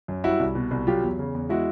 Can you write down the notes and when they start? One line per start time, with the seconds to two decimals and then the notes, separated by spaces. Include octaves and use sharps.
0.08 F#2
0.24 G3 E4 F#4
0.40 C2
0.55 B2
0.71 C2
0.87 F#3 F4 G4
1.03 E2
1.19 C#3
1.35 E2
1.49 G#3 E4 F#4